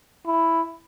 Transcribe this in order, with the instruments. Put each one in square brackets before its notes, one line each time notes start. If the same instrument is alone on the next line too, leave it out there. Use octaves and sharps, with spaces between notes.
[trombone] E4